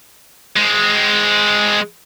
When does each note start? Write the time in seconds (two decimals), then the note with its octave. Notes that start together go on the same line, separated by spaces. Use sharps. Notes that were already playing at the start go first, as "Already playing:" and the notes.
0.56 G#3 C4